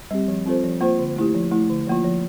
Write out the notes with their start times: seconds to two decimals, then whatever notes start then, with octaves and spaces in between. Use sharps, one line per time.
0.11 G3 C4 G4
0.28 F3
0.46 C4 F4 A4 C5
0.64 F3
0.81 A#3 F4 C5
0.99 D3
1.16 A3 E4 G4
1.35 F3
1.51 A3 E4
1.70 D3
1.87 F3 A#3 F4
2.04 F3